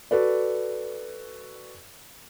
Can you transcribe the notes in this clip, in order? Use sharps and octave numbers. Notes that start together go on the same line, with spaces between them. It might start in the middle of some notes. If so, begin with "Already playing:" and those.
F#4 A4 B4 D5